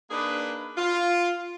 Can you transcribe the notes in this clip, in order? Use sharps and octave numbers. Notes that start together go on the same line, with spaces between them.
A#3 D4 D#4 G#4 B4
F4